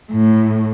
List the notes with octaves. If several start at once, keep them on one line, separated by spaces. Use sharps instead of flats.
A2